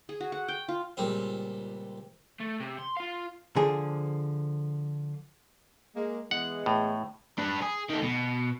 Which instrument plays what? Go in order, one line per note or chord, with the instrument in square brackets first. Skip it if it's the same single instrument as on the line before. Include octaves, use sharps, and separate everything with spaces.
[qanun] G#4
F#4
F#5
G5
F4
[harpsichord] C#2 A#2 G3 C4
[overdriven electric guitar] A3
C3
C6
F4 F5
[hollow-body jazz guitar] D3 F3 G#4
[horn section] G#3 A#3
[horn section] E3 G#3 B3 [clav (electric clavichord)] F#5
[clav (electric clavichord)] A2
[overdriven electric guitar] D4 B4
G#4
D#3 A3
B2